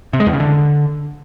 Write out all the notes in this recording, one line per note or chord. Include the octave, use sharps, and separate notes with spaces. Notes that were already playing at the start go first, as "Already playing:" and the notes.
C3
G#3
E2
C#3
D3